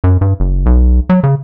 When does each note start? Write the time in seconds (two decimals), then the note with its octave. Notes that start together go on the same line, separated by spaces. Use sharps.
0.04 F#2
0.21 G2
0.40 F#1
0.66 B1
1.10 F#3
1.24 C#3